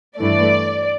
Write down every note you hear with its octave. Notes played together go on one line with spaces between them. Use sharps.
G2 E3 A3 D5